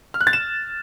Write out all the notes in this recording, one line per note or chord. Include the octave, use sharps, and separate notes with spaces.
F6
F#6
A6
E7